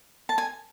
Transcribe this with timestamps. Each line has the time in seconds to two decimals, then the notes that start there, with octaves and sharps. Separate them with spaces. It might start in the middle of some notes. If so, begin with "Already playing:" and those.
0.29 A5
0.38 G#5